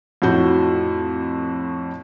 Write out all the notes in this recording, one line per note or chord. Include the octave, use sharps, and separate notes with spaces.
F2 A2 F#4 G6